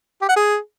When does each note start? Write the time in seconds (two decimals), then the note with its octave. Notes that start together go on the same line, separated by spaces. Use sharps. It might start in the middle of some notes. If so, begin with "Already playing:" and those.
0.22 G4
0.29 F#5
0.36 G#4